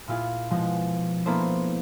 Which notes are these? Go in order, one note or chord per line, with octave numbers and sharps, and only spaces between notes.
A#2 E4 F4 G#4
B2 F3 G#3
A#3 B3 D4 E4 A4 C5